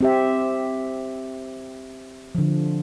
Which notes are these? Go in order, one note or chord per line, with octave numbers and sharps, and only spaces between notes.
C4 G4 E5
D3 F3